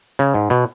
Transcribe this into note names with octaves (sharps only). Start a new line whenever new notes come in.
C#3
G#2
B2